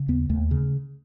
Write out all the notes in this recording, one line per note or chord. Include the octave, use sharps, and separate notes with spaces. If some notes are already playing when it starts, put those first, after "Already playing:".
Already playing: C#3
D#2 B3
D#2 A3
C#3